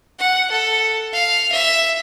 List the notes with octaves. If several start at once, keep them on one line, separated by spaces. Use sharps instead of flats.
F#5
A4
F5
E5